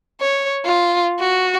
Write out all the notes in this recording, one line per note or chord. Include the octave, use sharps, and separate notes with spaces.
C#5
F4
F#4